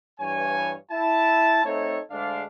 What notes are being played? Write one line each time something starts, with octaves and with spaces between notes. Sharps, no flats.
G2 E3 C#5 G#5
E4 A5
A3 C4 D#4 A4 C#5
D2 G#3 D4 F5